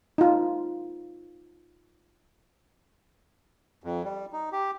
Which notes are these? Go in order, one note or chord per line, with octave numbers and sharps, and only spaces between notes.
D#4 F4
F2
G3
D#4
G4